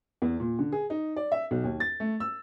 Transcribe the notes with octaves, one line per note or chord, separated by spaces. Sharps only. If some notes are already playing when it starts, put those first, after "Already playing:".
E2
A#2
D3
G#4
D#4
D5
E5
B1
D#2
A6
A3
E6